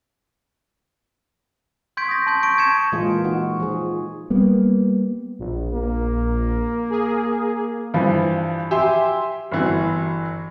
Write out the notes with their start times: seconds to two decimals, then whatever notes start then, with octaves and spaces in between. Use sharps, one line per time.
1.97 C6 C#6 G6 G#6 B6 D7
2.08 D#6 A#6
2.26 A5 C6 G6 G#6
2.43 C#6 D7
2.58 A5 G#6 C#7 E7
2.92 A#2 E3 G#3 A#3 F4 G#4
3.24 D#4 F#4
3.60 F3 G#4
4.30 G3 A#3 B3
5.39 A#1
5.74 A#3
6.90 G#4
7.94 G2 E3 F3
8.71 G4 E5 G5 G#5 C6
9.52 G1 E3 F#4